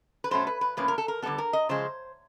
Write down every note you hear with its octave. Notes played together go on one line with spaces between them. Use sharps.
B4
B2 F#3 A3 C#4 C5
B4
B4
A2 F3 A#3 C#4 B4
A#4
A4
A#4
D3 G3 B3 A4
A#4
D#5
C#3 F3 G#3 C5